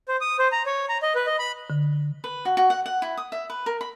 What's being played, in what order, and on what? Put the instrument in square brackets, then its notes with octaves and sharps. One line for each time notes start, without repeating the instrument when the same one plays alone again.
[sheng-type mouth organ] C5
D#6
C5
A#5
C#5
A#5
D#5
B4
D#5
B5
[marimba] D3
[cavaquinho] B4
F#4
F#4
F#5
F#5
E4
D#6
E5
B4
A#4
B5